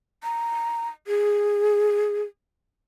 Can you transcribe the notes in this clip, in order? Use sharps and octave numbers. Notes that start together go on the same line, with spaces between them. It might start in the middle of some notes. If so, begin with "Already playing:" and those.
A#5
G#4